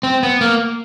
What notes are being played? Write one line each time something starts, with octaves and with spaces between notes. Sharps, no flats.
C4
B3
A#3